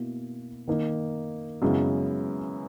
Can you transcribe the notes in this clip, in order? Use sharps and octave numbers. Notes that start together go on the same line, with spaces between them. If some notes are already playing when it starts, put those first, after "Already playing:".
Already playing: B2 A#3 E4
D#3 A#3 D#4
F#2 C#3 G#3 B3 E4